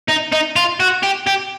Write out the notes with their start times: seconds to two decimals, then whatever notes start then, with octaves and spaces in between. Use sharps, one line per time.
0.09 D#4
0.32 D#4
0.56 F4
0.80 F#4
1.03 G4
1.27 G4